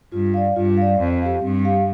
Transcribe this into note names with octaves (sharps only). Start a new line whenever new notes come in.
G2 F4
D5 F5
G2 F4
D5 F5
F2 C4
G4 F5
G2 C4
G4 F5